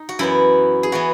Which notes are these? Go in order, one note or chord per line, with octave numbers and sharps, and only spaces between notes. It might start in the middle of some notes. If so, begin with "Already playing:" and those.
Already playing: D#4
F#4
F#2 E3 B3 E4
G#4
E3 B3 F#4